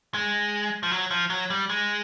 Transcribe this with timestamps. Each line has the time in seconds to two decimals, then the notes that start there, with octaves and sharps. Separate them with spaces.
0.14 G#3
0.83 F3
0.91 F#3
1.11 F3
1.30 F#3
1.50 G3
1.70 G#3